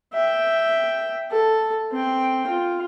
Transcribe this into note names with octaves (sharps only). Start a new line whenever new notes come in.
E5 G5
A4
C4 G5
F4